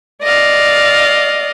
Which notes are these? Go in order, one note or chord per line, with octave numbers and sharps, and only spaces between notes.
D5 D#5 F5